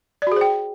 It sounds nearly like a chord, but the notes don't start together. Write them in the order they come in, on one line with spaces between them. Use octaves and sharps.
D5 F#4 G#4 C5 G5